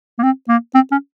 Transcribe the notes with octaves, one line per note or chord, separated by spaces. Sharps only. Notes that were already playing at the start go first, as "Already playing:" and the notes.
A#3
C4
A#3
C4
C#4